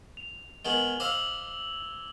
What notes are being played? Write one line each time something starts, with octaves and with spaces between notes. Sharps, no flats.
F7
D#3 G#3 B3 G#6 F#7 G7
C5 D#5 F5 D6 E6 F7